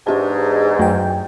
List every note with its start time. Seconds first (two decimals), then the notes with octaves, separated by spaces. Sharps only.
0.07 E2 G#2 D4 G4 A5
0.79 F#2 A3 G5